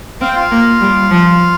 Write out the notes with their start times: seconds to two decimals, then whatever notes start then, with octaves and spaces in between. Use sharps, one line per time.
0.21 C4 F5
0.29 G5
0.35 F4 F5
0.51 A#3
0.81 G3
1.11 F3